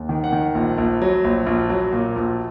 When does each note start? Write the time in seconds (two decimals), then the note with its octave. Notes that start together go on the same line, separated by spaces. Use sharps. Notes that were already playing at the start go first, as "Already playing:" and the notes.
Already playing: D#2
0.09 D#3
0.24 F#5
0.33 D#3
0.55 A#1
0.78 A#1
1.02 F#3
1.24 A#1
1.46 A#1
1.70 F#3
1.93 A#2
2.16 A#1